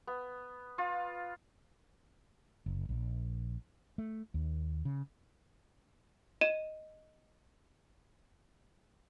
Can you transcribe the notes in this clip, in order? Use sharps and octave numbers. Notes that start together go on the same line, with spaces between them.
B3
F4
F#1
A#1
A3
D#2
C#3
D#5 D#7 E7